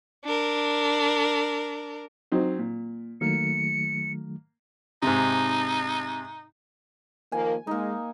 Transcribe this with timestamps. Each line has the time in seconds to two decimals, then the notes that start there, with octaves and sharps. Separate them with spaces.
0.24 D4 A#4
2.32 F#3 C4 D#4
2.59 A#2
3.21 D#3 F#3 A3 A#3 C#7
5.03 G#2 C3 D#4
7.32 D#3 F3 A#3 G#5
7.67 G#3 A#3 D#4